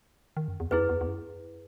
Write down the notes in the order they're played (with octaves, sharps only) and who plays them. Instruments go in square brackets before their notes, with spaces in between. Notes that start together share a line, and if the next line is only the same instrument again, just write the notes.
[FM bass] D#3
F#2
E2
[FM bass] E2 [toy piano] E4 G#4 B4
[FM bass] F#2
E2
E2
F#2